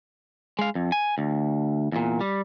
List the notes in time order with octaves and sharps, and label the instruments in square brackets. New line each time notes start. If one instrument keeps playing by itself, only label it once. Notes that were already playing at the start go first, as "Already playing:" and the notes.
[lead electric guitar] G#3 F5
F2
G#5
D2
E2 A#2
G3